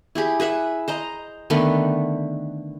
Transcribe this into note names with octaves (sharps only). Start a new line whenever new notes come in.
E4 G4 G#4
G#4 B4 E5 F#5
C5 D#5 A#5
D3 D#3 A3 B3